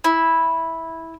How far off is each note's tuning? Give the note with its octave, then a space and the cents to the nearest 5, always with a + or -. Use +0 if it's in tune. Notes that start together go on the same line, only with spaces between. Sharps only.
E4 -10